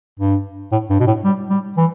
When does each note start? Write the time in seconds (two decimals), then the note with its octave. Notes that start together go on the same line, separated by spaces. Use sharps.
0.19 G2
0.72 A2
0.90 G2
1.00 B2
1.07 A2
1.24 G3
1.50 G3
1.77 E3